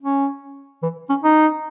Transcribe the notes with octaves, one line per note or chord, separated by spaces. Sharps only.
C#4
E3
C#4
D#4